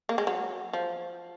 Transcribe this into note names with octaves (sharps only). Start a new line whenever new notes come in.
A#3
G#3
F#3
F3